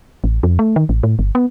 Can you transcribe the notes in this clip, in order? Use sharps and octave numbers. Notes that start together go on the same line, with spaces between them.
A1
F2
A3
D#3
A1
A2
G1
B3